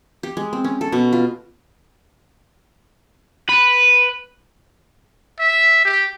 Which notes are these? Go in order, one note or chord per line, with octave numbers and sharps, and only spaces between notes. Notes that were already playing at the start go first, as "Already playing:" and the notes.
G4
G#3
C4
C#4
A4
B2
F4
B4
E5
G4